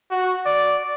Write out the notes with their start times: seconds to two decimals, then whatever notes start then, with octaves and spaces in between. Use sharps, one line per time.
0.11 F#4
0.46 D5